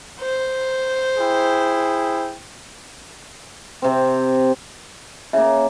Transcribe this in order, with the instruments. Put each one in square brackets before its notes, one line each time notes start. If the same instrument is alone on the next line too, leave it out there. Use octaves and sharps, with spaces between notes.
[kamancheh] C5
[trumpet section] E4 G#4 G5
[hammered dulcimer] C3 C4
[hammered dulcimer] C#3 A#3 [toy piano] E5